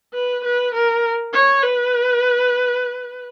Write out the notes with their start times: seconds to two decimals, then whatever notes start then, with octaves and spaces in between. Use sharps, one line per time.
0.14 B4
0.45 B4
0.74 A#4
1.34 C#5
1.63 B4